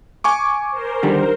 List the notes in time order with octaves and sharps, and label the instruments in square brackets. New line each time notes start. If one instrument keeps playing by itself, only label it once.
[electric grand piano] G#5 C#6 D6
[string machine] A#4 C5
[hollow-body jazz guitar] D3 D#3 G3